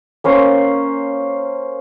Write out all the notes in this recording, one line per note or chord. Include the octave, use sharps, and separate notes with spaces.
A#3 C#4 C5